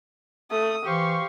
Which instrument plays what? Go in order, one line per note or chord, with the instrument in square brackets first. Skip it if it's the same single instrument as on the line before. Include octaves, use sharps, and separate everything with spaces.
[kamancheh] A3 D#6
[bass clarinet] E3 [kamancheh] G4 [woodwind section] C5 F5 C#6